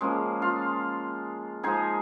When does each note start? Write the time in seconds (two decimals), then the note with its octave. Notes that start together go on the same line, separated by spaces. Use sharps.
0.01 F3 G#3 A#3 C#4 G#4
0.42 F4 F5
1.63 F3 G#3 D#4 G#4 G#5